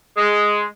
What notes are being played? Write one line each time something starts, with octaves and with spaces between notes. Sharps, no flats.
G#3